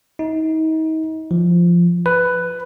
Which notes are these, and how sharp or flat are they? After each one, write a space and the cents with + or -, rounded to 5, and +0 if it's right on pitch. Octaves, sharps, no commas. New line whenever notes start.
D#4 +35
F3 -10
B4 +10